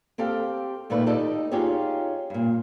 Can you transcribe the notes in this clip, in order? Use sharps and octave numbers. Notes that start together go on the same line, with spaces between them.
C4 G4 A4 F5 G5
A#2 D#3 A3 F4 B4
D#4 G4 A4 D5 D#5
C#4 D#4 F4 G4 G#4 C#5
G2 A#2